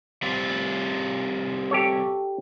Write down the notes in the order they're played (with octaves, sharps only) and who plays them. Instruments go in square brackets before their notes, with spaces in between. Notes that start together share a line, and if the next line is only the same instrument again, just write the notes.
[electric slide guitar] G3 C4 F4
[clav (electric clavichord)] G4 A4 C#5